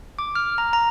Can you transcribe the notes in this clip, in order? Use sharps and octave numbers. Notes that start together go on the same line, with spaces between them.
D6
F6
A#5
A#5